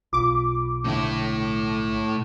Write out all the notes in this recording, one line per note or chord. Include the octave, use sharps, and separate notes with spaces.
B1 F4 B5 D6
A2 D3 E4